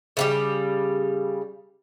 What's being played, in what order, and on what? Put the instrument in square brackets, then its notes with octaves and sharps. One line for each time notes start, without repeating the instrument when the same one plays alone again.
[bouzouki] C#3 E3 G3